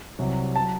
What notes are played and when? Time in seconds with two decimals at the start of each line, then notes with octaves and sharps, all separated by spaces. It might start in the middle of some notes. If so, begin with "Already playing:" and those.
0.19 C2 C3 F#3
0.56 A5
0.59 F#3